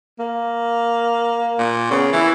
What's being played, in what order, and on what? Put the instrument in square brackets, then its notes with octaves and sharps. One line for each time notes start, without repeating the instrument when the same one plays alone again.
[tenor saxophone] A#3
[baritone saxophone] A#2
[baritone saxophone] C#3 [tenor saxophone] B3
[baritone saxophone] E3 [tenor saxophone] E4